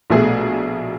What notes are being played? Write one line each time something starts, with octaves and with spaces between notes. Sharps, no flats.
A#1 B2 A3 G#4